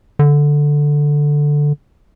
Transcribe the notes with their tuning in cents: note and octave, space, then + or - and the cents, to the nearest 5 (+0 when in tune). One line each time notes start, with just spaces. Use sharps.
D3 +0